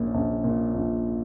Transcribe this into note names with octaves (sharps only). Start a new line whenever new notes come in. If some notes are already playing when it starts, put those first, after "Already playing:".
Already playing: A#1 A#2 C#4
A#1
A#2
A#1